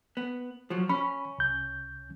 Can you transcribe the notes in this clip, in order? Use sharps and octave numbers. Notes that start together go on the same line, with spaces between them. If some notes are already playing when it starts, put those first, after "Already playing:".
B3
F3 F#3
C#4 B5
C2 G6